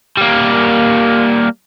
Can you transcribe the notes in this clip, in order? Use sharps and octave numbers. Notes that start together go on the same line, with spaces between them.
G3 A#3